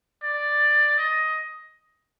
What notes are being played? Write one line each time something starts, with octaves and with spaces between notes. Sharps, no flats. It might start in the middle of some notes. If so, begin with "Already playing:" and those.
D5
D#5